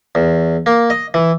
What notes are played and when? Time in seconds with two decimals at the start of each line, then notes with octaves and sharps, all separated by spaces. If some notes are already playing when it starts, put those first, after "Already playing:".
0.15 E2
0.66 A#3
0.90 D#5
1.14 E3